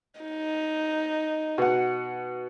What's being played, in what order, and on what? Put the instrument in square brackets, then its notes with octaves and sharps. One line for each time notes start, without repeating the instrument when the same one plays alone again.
[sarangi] D#4
[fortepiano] B2 F#5